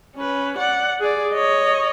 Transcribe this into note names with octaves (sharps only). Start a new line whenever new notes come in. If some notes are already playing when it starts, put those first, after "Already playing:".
C#4 B4
D5 F#5
G#4 D5
C#5 D#5